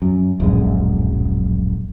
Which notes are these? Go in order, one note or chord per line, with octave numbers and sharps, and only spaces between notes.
F#2
D1 A#1 F#2 G#3